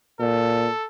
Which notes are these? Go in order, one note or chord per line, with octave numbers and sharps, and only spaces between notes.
A#2 A4